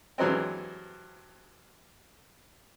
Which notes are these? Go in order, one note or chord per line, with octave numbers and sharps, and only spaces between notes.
G2 E3 F#3 G#3 C4